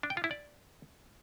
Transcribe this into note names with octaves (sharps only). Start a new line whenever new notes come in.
D4
G5
F4
E4
D5